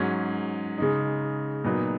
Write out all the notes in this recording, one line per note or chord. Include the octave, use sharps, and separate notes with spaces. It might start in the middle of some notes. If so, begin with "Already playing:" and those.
Already playing: G#2 F#3 C#4
C#3 G#3 D#4
A#2 F#3 B3 D#4